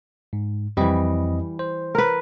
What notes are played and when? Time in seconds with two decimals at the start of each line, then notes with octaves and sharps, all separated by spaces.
0.33 G#2
0.77 F2 E3 G3 C4 D#5
1.59 C5
1.95 A#4 B4